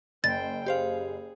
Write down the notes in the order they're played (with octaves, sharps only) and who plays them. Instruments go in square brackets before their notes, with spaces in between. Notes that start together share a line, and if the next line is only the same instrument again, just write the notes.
[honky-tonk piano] F#1 [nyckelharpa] C5 G5 [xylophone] A6
[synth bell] G4 C5 F5 [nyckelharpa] G#4